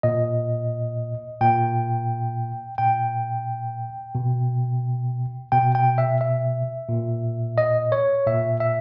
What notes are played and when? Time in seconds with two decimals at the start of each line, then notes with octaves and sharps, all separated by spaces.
0.03 A#2 D#5
1.41 A#2 G5
2.78 A#2 G5
4.15 B2
5.52 B2 G5
5.75 G5
5.98 E5
6.21 E5
6.89 A#2
7.58 D#5
7.92 C#5
8.26 A#2 E5
8.60 E5